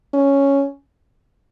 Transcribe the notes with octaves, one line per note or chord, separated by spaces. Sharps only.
C#4